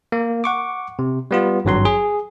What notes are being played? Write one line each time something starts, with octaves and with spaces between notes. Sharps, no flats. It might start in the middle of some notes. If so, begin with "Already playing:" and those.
A#3
F#5 C#6 D6
C3
G3 B3 F4
G#1 G2 F#3 C6
G#4